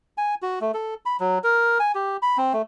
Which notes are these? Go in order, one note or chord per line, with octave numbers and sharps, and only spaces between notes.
G#5
F#4
A3
A4
B5
F#3
A#4
G#5
G4
B5
C4
A3